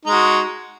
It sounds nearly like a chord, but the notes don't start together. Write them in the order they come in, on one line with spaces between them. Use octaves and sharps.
D#4 G#3 F#4